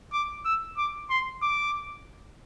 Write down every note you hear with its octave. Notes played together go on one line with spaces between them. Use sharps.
D6
E6
D6
C6
D6